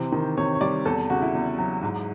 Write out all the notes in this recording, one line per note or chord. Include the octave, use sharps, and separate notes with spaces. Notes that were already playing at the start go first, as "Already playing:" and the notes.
Already playing: C3 E3 C5
D#3
C3 C#5
C#5
G3 D5
E2 A4
C#3 F#4
E4
E2
F#3
G#2